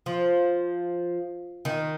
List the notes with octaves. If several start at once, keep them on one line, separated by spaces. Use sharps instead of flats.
F3
D#3